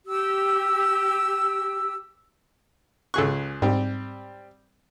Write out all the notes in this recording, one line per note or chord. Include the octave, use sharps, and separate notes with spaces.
G4 E6
C#2 G#4 A4 C#6 F#6
G#2 G3 C4